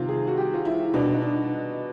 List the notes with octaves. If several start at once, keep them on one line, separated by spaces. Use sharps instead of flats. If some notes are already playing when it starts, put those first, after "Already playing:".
Already playing: C3 D#3 F4
G#4
F#4
G4
F4
E4
B2 D4
D#4
D4